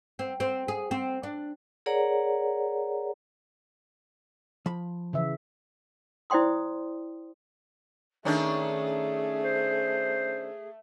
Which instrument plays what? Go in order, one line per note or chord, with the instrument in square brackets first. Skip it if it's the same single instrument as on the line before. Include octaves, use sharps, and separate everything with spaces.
[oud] C4
C4
G#4
C4
D4
[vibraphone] G#4 A#4 C#5 D5 F#5 A#5
[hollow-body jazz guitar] F3 B5
[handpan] C#3 E3 E5
[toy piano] E4 C5 D5 G5 C6 D#6
[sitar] D#3 C#4 D4 [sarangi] A3 [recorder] G#4
[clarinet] C5